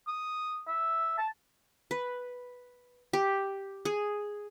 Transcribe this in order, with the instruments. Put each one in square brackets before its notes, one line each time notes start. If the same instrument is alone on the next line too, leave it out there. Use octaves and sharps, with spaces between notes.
[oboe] D#6
E5
A5
[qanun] B4
G4
G#4